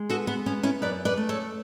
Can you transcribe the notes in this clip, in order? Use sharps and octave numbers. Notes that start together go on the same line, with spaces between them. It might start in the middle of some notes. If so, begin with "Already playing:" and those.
Already playing: G#3
B3 F#4 A4
B3
B3 C#4
C#4 E4
F#2 B4 D5
B4 D5
A3
A4 C#5